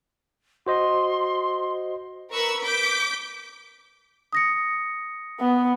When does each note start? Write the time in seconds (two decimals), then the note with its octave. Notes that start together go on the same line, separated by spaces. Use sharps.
0.67 F#4 C5 D#5 C6
2.33 A#4 B4 B5 C#6 E6
2.64 D6 G6 B6
4.33 D#6 A#6 C#7
5.39 B3